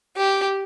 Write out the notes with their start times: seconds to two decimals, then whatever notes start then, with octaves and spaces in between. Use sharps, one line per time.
0.17 G4